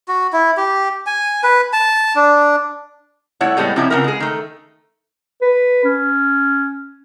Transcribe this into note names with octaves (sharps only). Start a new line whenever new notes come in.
F#4
E4
G4
G#5
B4
A5
D4
G3 A3 E4 C#5 F#5
A2 G3 G#3 B3
C3 F3 C#4 D4 E4
C#3 B3 C#4 E4 F4 A#4
G#3 G#4
D#3 A3
B4
C#4